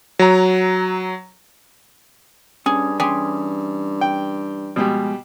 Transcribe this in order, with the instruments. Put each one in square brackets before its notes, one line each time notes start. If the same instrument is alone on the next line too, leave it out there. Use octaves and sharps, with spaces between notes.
[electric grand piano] F#3 A#5
[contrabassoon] G2 [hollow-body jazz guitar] C#4 [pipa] G#4
[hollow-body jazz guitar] E3 C#4 C6 [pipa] G4 G#4
[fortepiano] G5
[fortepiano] B2 G3 [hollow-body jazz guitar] F3 G#3